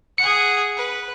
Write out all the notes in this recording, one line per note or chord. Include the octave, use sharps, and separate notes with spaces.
G#4 F#5 C#7
B4